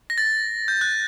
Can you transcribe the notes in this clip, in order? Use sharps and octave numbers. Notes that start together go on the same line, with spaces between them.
A#6
A6
G6
F#6